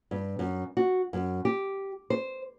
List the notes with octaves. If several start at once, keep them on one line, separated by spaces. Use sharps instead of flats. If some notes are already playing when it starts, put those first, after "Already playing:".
G2
F#2
F#4
F#2
G4
C5